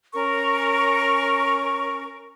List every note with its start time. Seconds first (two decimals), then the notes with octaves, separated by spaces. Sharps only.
0.14 C#4 A#4 C#6